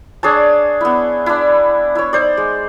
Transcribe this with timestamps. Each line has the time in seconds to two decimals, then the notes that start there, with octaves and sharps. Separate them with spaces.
0.23 D4 G#4 C#5 A5
0.81 B3 E4
1.26 D4 E4
1.95 E4 C#5
2.13 D#4 C5 D5
2.37 G#3